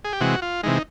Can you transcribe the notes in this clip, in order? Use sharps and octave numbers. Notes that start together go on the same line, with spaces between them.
G#4
G4
C3 E3 G#3 F#4
F4
C3 E3 G#3 D#4